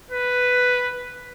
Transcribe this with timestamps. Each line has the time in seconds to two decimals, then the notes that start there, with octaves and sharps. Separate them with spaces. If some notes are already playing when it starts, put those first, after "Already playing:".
0.11 B4